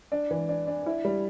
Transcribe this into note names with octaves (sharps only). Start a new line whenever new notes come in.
D4
E3
D4
D4
E4
G3